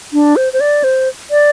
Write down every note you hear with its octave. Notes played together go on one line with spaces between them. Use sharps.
D4
C5
C5
D5
C5
D5